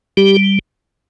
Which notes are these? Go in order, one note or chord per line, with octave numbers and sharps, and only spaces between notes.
G3 G4